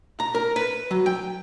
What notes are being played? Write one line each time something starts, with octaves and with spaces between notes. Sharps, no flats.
A#5
A#4
B4
F#3
G5